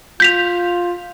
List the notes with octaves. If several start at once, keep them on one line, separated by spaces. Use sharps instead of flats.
F4 G6 B6 F7